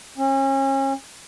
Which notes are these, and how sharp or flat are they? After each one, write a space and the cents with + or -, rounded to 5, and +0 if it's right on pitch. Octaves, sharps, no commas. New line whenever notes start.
C#4 -35